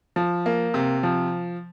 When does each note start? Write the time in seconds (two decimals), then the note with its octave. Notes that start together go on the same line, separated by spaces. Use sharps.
0.16 F3
0.46 A#3
0.74 C3
1.03 F3